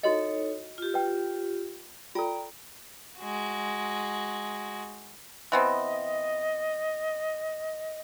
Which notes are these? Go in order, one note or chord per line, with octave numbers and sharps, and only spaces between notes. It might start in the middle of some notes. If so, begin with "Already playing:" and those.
D#4 E4 F#4 A4 C#5 D#5
F4 G4
B4 G5
F4 A4 D5 G5 A#5
G#3 F#4
E3 B3 C4 D#5